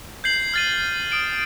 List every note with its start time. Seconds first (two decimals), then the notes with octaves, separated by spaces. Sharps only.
0.24 G6 G#6 C7 F#7
0.54 F6 G#6 A6 C7 D#7
1.11 D#6 D7 E7